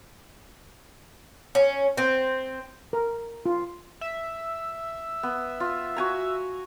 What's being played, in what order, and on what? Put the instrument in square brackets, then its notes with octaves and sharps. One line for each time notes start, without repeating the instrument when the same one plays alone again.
[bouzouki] C#4
C4
[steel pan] A#4
F4
[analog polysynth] E5
[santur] B3
F4
F#4 G#5 A#5